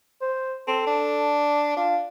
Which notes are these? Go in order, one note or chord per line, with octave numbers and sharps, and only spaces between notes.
C5
C4 A4
D4
D4 F4